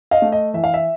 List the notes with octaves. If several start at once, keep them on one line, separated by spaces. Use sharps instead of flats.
D#5 F5
A3
D#5
E3 E5
F5
E5